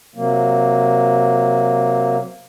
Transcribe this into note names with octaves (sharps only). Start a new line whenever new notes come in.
C3 F#3 A#3